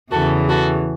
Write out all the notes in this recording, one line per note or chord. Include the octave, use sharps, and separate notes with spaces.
E2 C#3 E3 F#4 A4
F#4 A4